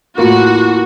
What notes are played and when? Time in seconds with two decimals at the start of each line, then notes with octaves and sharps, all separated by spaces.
0.18 E2 A2 A#3 F4 F#4